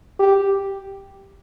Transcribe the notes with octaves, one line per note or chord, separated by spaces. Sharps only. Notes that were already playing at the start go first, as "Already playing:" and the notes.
G4